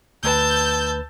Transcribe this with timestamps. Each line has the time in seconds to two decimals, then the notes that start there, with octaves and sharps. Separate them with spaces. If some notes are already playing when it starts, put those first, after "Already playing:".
0.24 D2 B4 A5 E6 G6